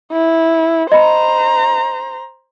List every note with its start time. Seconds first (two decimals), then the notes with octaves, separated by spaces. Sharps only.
0.12 E4
0.92 C5 D#5 A#5 B5